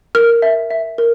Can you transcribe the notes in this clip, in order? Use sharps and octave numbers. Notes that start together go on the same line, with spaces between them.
A#4 F6
E5
E5
A#4